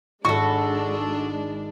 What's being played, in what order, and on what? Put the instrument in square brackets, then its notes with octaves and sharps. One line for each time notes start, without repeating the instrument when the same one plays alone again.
[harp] G#1 G#2 B5 [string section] G#3 D4 [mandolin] F#4 A4 [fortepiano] C#6